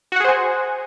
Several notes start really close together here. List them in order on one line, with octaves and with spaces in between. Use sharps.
F#4 F#5 G#4 C5 G#5